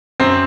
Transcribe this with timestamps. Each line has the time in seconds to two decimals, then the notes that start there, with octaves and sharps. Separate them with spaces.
0.20 F#2 C4